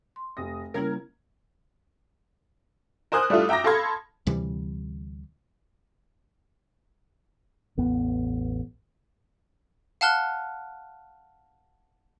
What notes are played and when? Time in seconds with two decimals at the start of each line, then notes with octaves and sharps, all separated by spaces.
0.16 C6
0.37 F1 D#6 A#6
0.74 C#3 G3 A#3 C#4 E4 A#4 G#6
3.12 A#4 C5 G#5 D#6 F#6
3.30 G3 A3 D4 E4 F4
3.49 E5 G5 A#5 D6 A#6
3.64 A4 F5 B5 C6 G#6
4.27 D2 C3 E3 G3
7.78 A1 E2 B3
10.01 F5 F#5 A5 F6 F#6 G7